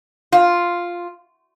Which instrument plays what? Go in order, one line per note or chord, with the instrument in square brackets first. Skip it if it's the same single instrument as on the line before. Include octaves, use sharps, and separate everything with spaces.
[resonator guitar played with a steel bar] F4